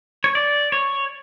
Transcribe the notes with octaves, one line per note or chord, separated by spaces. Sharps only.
C#5
D5
C#5